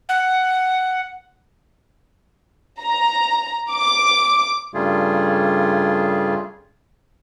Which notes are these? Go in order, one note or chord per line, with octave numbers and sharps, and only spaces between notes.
F#5
A#5
D6
G2 C#3 G3 A3 F4 G#4